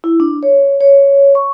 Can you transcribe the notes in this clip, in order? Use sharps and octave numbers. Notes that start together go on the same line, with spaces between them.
E4
D4
C#5
C#5
C#6